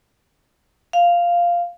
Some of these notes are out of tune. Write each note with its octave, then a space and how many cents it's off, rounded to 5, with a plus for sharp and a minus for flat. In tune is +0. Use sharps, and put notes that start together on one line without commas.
F5 -5